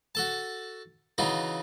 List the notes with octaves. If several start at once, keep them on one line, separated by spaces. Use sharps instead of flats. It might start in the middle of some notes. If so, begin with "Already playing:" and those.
F#4 A4 A5
C#3 E3 D#4 F4 F#4